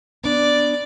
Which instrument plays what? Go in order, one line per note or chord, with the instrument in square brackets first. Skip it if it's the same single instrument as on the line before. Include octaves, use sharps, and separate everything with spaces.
[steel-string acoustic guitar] B3 D4 [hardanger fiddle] D5